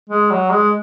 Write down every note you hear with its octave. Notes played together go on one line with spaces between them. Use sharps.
G#3
F#3
G#3